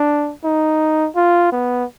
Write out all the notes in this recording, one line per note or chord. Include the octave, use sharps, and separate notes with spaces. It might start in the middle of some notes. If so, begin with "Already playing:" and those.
Already playing: D4
D#4
F4
B3